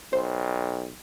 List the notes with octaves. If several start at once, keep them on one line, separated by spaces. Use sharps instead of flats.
B1 C5